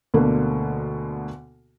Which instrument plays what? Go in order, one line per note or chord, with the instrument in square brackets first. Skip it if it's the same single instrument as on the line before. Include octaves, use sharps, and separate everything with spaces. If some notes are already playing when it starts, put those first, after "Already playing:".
[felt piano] D2 B2 D3 A#3